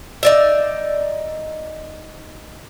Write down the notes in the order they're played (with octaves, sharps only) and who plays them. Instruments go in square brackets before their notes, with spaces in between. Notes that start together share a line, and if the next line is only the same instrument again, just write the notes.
[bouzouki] D#4 D5 E5